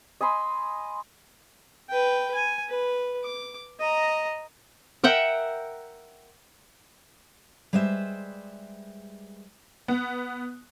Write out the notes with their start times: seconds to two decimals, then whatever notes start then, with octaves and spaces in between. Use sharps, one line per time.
0.21 D#5 G#5 B5 C6
1.89 B4 G5
2.35 G#5
2.69 B4
3.24 D6
3.80 D#5 A#5
5.04 A#4 E5 F#5 G5
7.73 G3 G#3 B4 C5 E5
9.88 B3